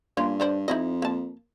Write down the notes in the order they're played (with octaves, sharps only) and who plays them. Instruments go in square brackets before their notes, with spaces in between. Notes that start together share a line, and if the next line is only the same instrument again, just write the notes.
[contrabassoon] G2 [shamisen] A#3 C#4 F4
[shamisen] D3 D4 C5
[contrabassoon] F2 [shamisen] D#4 E4 D#5
[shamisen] A#3 A5